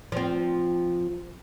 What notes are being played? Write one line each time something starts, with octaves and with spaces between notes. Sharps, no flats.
F3 C4